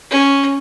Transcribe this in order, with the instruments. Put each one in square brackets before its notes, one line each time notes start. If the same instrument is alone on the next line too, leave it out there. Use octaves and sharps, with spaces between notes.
[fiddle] C#4